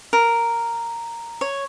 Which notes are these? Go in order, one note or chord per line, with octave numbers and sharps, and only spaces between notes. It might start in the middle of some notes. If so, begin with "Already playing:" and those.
A#4
C#5